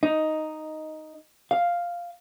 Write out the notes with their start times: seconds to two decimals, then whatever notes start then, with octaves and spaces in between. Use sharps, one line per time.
0.03 D#4
1.51 F5